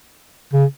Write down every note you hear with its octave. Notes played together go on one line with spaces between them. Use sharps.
C#3